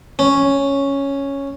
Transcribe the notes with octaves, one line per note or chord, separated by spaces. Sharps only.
C#4